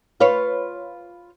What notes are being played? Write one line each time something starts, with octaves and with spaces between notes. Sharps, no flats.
F4 B4 C#5